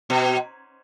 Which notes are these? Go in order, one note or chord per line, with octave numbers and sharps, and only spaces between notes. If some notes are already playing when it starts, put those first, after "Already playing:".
B2